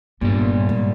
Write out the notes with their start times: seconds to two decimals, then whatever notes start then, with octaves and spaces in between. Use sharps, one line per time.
0.21 G2 A#2 G3 B3
0.69 G#2